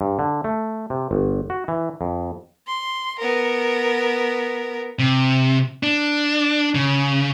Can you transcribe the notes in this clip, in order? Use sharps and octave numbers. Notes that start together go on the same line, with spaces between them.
G2
D3
A3
C3
G1
F#4
E3
F2
C6
B3 A#4
C3
D4
C#3